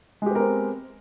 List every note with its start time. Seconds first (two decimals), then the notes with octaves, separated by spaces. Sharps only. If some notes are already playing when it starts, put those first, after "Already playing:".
0.22 G#3
0.26 G4
0.31 B3
0.35 A#4
0.40 C4